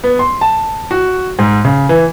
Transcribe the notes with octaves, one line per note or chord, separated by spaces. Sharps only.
B3
C6
A5
F#4
G#2
C#3
E3